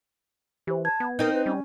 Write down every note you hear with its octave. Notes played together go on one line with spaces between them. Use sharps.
E3 G4 C5
A5 G#6
B3
C4 D#4 A#4 G6
B4
G3 C#4